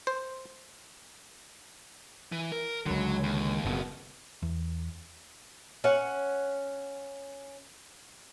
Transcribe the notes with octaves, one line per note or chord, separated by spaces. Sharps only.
C5
E3
A#4
C#2 D3 F#3
D#2
F#1 F2 B2
E2
C#4 F#5